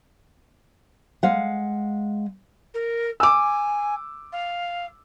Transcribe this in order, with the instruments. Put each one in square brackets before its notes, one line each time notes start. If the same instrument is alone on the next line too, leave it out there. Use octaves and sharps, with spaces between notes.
[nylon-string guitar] G#3 F5 F#5
[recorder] A#4
[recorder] G#5 [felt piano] D6 E6
[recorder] F5